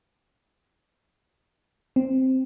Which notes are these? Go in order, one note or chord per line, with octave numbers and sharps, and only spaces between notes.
C4